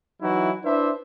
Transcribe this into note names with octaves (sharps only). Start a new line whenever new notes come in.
E3 F#3 D#4 E4 F#4
D4 E4 B4 C5 E5